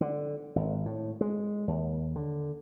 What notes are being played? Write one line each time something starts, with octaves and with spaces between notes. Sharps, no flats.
D3
G#1
A2
G#3
D#2
D3